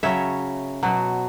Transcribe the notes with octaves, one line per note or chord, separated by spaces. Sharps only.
C#3 F#3 C#5 E5
B2 F#3